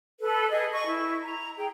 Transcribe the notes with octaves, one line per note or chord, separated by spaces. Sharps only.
A4 B4
G#4 D#5
D#5 C#6
E4
A#5
G#4 G5